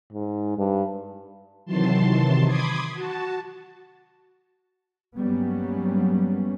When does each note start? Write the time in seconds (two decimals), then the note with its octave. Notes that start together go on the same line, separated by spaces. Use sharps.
0.12 G#2
0.58 G2
1.66 C3 D#3 E3 F#3 A5 C6
2.45 B5 C6 D6 D#6 G#6
2.93 F#4 A5
5.16 G2 F#3 G3 A#3 B3 C#4